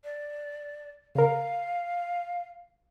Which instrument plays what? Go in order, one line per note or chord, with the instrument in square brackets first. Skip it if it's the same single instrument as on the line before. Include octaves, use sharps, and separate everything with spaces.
[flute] D5
[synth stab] C#3 A#4 [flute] F5